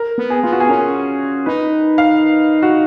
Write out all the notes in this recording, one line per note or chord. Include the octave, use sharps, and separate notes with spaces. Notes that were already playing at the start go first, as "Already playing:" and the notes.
Already playing: A#4
B3
G#4
B3 F4
F#4
G#4
C#4 A#4
D#4 B4
F5
F#4